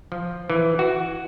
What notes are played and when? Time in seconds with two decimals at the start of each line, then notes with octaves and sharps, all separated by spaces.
0.12 F3
0.50 E3
0.79 F#4